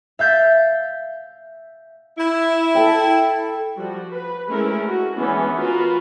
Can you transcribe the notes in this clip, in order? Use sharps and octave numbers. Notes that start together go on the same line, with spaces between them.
E5 F5 G6 A6 B6
E4
A4 G5
F3 G3 F#4
B4
G#3 A3 C#4 E4 A#4
F#4
E3 G#3 B3 C#4 D4 E4
B3 F4 F#4 A#4 B4